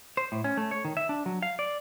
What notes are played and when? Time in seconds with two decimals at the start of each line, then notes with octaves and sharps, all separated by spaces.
0.17 C5
0.32 A2
0.44 C#4
0.57 A3
0.71 C#5
0.85 D#3
0.97 E5
1.09 D4
1.26 F#3
1.43 F5
1.59 D5